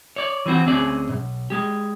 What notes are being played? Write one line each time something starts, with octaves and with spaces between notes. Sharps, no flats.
C#5 D5
E3 F#3 C4 F#4
D2 C4 C#4 G#4 D5
B1 G#2
G#3 G4